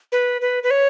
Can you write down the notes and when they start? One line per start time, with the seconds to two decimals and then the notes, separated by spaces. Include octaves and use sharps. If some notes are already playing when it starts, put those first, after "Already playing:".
0.12 B4
0.41 B4
0.63 B4
0.71 C#5